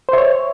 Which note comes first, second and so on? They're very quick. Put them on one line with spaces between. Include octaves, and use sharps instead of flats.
C5 E5 C#5